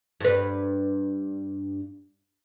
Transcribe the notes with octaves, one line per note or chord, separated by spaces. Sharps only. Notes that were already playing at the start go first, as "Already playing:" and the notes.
G2 B4